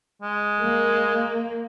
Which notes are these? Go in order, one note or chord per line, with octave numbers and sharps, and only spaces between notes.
G#3
A#3